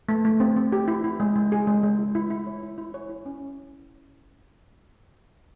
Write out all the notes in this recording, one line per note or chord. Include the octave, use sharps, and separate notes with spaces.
A3
A3
C4
C4
G4
E4
E4
G#3
G#3
G#4
G#3
G#3
E4
E4
E4
C#5
E4
E4
C#5
E4
C#4